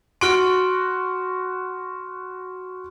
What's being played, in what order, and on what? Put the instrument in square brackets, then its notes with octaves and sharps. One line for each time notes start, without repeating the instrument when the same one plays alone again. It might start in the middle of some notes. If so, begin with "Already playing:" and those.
[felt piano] F#4 D7 [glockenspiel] C6 C#6 F6